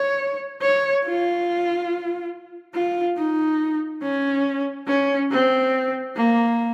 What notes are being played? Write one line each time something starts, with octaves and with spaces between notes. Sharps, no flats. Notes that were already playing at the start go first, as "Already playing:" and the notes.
Already playing: C#5
C#5
F4
F4
D#4
C#4
C#4
C4
A#3